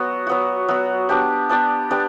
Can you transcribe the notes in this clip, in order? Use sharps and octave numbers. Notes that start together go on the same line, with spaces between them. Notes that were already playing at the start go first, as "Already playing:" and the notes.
Already playing: F#3 B3 F#4
F#3 B3 F#4
F#3 B3 F#4
B3 D4 G4 D5
B3 D4 G4 D5
B3 D4 G4 D5